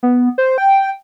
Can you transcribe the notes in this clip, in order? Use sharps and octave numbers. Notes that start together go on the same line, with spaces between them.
B3
C5
G5